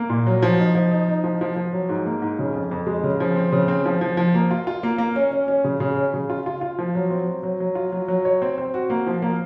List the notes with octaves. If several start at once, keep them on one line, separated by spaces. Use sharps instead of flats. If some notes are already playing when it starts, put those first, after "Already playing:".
Already playing: A#3
A#2
F#3
F3
D#4
F3
D#4
D#4
F3
F3
F3
F#3
G#2
A#3
G#2
C#3
F2
F2
G#3
C#3
F3
C4
C#3
C4
F3
F3
F3
A#3
F4
F4
A#3
A#3
C#4
C#4
C#4
C#3
C#3
C#4
C#3
F4
F4
F4
F3
F#3
C4
F#3
F#3
F#3
F4
F#3
F#3
C#5
C4
C4
F#4
A#3
F3
A#3